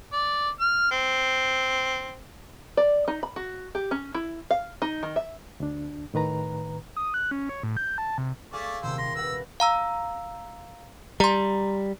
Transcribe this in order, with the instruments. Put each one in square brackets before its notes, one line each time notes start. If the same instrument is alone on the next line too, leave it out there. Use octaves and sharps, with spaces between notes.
[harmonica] D5
F6
C4
[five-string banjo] D5
D#4
B5
F#4
G4
C#4
E4
F5
D#4
D#3
E5
[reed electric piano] D2 D4
A2 D#3 B4 A#5
[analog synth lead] D#6
F#6
C#4
C#5
A2
G6
A5
C3
[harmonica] A3 D5 [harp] G#4 F5 G#5
[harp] D#1 C3 [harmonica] C5 E6
[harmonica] C6 [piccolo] A#6 [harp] B6
[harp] B4 F#5 [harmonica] E6
[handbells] F5 A#5 E6
[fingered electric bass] G3 [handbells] A#5 C6